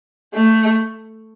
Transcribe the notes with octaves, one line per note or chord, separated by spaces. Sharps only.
A3